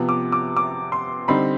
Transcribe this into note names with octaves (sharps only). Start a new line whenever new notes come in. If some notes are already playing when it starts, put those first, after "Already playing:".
Already playing: C3 F3 B3
D6
D6
D6
C6
D3 G3 C4 D#4 B5